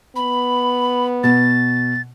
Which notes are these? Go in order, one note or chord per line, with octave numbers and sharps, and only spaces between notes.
B3 B5
B2 A6